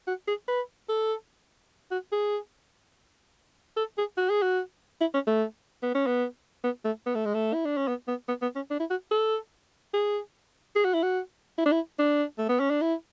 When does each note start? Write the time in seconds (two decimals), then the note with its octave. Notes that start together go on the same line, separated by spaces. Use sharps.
0.07 F#4
0.28 G#4
0.48 B4
0.89 A4
1.91 F#4
2.12 G#4
3.77 A4
3.98 G#4
4.17 F#4
4.30 G#4
4.42 F#4
5.01 E4
5.14 C#4
5.27 A3
5.83 B3
5.95 C#4
6.07 B3
6.64 B3
6.85 A3
7.06 B3
7.15 A3
7.25 G#3
7.34 A3
7.54 E4
7.65 D4
7.77 C#4
7.88 B3
8.08 B3
8.28 B3
8.42 B3
8.56 C#4
8.70 D4
8.80 E4
8.90 F#4
9.11 A4
9.94 G#4
10.76 G#4
10.85 F#4
10.93 E4
11.03 F#4
11.58 E4
11.66 D4
11.72 E4
11.99 D4
12.38 A3
12.49 B3
12.60 C#4
12.70 D4
12.82 E4